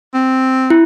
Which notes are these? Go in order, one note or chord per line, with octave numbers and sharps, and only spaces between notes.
C4
E4